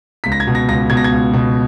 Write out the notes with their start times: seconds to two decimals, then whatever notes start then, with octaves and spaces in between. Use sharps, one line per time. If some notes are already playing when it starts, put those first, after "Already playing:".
0.24 C#2 B6
0.32 A#6
0.40 G#6
0.47 B2
0.55 A#6
0.68 C#2 A#6
0.90 B2 G#6
0.97 A#6
1.04 G#6
1.12 C#2
1.33 B2